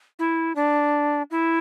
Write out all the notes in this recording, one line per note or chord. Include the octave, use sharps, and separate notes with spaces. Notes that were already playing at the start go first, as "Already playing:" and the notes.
E4
D4
E4